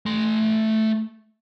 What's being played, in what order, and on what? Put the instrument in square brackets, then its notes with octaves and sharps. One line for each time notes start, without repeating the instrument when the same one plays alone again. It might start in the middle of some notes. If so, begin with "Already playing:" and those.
[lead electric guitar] A3 C6